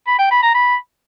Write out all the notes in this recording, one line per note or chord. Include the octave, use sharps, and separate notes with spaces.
B5
G5
B5
A#5
B5